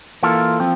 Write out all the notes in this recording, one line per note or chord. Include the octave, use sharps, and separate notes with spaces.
E3 A#3 F4 A4
F3 C4